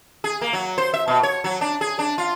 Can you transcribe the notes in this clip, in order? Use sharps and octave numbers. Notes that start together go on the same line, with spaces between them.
G#4
A#3
F#3
C5
E5
B2
C#5
F#3
D4
G#4
D4
F4